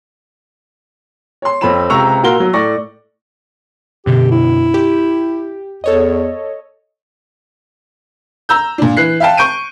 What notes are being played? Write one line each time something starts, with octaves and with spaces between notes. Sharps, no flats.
C#5 C6
F2 C4 C#5 B5 E7
C#2 C3 A#5 C#6 E6 F7
A#2 A#3 F#4 A#4 C6 G7
F#3
A2 D5 C#6 A#6
F#2 B2 D3 G4
E4
G4
E2 A4 C#5 D#5
A#5 E6 G6
A#2 D4
E3 F#6 C7
E5 F5 G5 A5
C#6 G6 D7 D#7